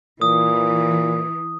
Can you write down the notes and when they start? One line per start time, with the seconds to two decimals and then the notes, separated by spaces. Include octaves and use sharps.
0.21 A#2 E3 D#6